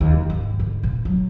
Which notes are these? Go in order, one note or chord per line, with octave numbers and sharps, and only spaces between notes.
D#2
D1
G#2
D3
A#2
F#3